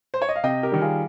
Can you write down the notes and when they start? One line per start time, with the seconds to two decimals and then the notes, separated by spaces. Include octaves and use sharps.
0.14 C5
0.22 C#5
0.29 D#5
0.36 F5
0.44 C3 D#5 G5
0.63 G4 A#4
0.72 D#3 G3
0.81 F4 G#4